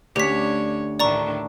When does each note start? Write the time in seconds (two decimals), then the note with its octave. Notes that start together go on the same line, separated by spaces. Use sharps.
0.16 D2 C#4 D4 G4 C#5 B6
1.00 A2 D#3 D4 D5 A#5 C#6